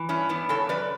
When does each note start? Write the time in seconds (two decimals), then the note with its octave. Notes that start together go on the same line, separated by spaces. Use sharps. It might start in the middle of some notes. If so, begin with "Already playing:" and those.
Already playing: E3
0.09 G2 C#4 E4
0.29 E3 B3 D4
0.49 C#3 A4 C#5
0.69 F#2 B4 D5